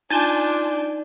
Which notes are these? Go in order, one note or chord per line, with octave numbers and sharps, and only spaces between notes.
D4 D#4 F4 G#5 A5 G6